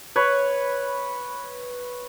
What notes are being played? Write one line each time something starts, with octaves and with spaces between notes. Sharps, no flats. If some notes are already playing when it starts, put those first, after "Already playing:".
B4 C#5